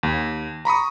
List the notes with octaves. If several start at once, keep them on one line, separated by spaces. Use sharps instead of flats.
D#2
A#5 B5 C#6 D#6